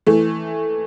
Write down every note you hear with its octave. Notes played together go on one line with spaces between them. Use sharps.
E3 A3